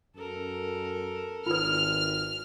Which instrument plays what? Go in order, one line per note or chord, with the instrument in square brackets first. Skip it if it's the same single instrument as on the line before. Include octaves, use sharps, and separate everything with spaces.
[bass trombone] F#2 [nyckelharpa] A4 A#4
[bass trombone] G#1 [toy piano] F4 B4 [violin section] F6